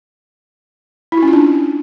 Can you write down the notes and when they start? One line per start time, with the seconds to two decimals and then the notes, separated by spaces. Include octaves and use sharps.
1.12 E4
1.17 F#4
1.23 C#4
1.28 F4
1.33 D4